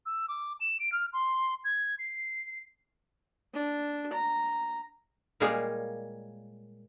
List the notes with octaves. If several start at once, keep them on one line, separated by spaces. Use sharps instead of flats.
E6
D6
E7
D7
F6
C6
G#6
C7
D4
A#5
A#2 G3 G#3 A#3 G#4 C#5